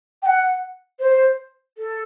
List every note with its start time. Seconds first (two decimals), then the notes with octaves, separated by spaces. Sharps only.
0.22 G5
0.26 F#5
0.99 C5
1.78 A4